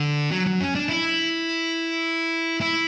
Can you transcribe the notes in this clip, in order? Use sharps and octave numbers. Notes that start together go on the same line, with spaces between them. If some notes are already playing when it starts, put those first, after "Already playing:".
Already playing: D3
F#3
F#3
C#4
D4
E4
E4